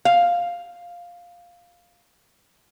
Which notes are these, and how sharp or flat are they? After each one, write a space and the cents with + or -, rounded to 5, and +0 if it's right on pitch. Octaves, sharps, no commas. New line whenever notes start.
F5 +5